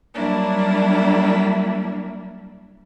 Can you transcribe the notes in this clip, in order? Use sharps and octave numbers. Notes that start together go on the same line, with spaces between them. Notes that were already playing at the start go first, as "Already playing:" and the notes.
F#3 G3 A#3 D4 E4